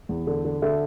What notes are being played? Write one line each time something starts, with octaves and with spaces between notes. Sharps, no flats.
E2
D3
D3
D3 E5